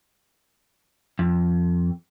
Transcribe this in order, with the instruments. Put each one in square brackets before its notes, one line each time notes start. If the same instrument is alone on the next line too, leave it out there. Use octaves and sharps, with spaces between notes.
[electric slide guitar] F2